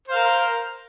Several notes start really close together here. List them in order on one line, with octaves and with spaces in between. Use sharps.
C5 F5 A#4